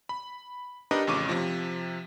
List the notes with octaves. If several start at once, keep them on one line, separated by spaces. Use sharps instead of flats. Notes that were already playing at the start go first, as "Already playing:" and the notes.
B5
D4 D#4 G4 A#4 B4 D#5
A1 F2 C#3 C#6 D6 D#7
C3 F3